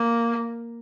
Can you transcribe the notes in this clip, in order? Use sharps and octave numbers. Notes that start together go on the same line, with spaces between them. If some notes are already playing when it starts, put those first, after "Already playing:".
Already playing: A#3